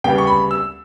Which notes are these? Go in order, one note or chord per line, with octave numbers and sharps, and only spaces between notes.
D2 C#3 G3 B3 G5
C#6
B5
E6